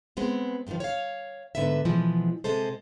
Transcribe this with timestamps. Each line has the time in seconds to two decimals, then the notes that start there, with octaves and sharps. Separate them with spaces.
0.17 G#3 B3 C4
0.67 G2 A#2 D3 D#3 F3
0.80 C#5 F5
1.55 G#2 D3 D#3 B3 B4 E5
1.85 B2 E3 F3 G#3 B3
2.44 G#2 C3 G#3 A4 C5